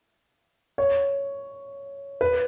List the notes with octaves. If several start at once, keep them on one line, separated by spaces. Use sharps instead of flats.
C#5
B4